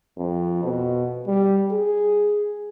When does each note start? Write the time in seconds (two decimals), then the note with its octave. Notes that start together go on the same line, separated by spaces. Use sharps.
0.18 F2
0.64 B2
1.27 G3
1.72 G#4